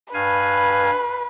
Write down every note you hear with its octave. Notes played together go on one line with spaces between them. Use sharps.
G2 B4 F5 G#5